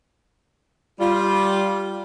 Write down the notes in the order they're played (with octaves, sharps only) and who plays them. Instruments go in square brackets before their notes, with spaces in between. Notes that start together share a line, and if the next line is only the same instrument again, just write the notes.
[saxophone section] G3 F4